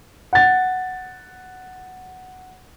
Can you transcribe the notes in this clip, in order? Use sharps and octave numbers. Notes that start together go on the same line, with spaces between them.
F#5 A6